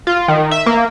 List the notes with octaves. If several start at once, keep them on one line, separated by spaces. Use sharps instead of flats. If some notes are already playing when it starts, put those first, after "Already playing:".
F4
D#3
E5
A#3